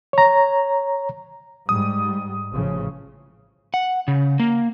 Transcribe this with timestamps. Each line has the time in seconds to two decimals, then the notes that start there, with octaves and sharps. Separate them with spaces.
0.13 C#5 A#5
1.69 G#2 G3 D#6
2.50 A1 C#3 F3
3.74 F#5
4.08 C#3
4.40 A#3